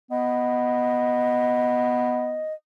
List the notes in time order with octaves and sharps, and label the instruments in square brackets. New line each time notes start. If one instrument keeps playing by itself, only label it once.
[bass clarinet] B3 [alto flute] D#5